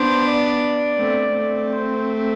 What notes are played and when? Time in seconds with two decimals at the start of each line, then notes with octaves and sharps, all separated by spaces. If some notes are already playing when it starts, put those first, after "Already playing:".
Already playing: B3 D4 C5
0.25 D5
0.97 A3 C4
1.34 A3 C4
1.71 C5